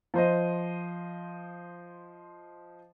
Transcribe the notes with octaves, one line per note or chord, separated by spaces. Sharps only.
F3 C5 D#5